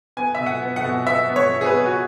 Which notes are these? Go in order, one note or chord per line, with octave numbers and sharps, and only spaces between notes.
B3 G#5
B2 E5
F#5
B3
F#5
B2
B3 E5
B3
C#5
B3
G#4
B4
B3
F#4